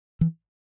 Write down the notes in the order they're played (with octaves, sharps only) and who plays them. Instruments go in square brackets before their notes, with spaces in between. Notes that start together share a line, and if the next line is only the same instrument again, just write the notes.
[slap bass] E3